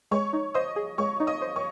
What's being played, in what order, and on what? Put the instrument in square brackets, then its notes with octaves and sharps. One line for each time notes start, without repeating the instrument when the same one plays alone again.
[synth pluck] G#3 [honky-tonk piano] C#5 C#6
[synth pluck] D#4
[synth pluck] C5 [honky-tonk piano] D#5 D#6
[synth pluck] G#4
[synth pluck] G#3 [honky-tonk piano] C#5 C#6
[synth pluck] D#4
[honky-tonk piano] D#5 D#6
[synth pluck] C5
[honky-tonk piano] C#5 C#6